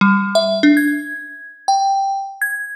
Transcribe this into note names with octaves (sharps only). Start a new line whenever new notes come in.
G3
E5
D4
G#6
G5
G#6